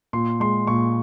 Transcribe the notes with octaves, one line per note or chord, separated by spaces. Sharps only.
A#2 C6
G#3 C6
A#2 C#6